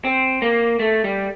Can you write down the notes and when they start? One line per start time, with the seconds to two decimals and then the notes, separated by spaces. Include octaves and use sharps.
0.05 C4
0.42 A#3
0.79 A3
1.04 G3